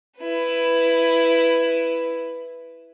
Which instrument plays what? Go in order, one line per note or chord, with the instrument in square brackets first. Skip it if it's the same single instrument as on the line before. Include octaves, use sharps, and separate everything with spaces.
[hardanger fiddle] E4 B4